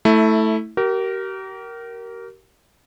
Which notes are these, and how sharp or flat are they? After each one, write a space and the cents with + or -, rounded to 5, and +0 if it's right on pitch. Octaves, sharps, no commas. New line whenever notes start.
A3 +0 E4 -15
G4 -40 A#4 +0